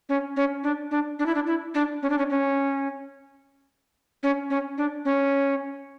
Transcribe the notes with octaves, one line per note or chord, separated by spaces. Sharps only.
C#4
C#4
D4
D4
D4
E4
D4
E4
D4
C#4
D4
C#4
C#4
C#4
C#4
D4
C#4